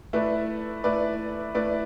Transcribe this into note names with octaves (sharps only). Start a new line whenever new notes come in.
A3 E4 B4 D5
A3 E4 B4 D5
A3 E4 B4 D5